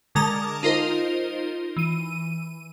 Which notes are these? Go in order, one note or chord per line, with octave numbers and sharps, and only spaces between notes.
D3 G#3 A#4 A5 A#5 D#6
D#4 F4 A#4 C5 D#5
E3 D#7